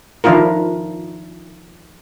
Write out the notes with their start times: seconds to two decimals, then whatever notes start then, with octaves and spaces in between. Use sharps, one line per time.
0.24 D#3 F3 D4 E4 F4 A#4